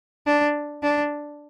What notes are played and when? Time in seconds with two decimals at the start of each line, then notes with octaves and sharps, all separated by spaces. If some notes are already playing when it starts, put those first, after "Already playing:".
0.27 D4
0.83 D4